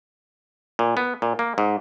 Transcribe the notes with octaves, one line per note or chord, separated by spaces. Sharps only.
A#2
B3
A#2
A#3
G#2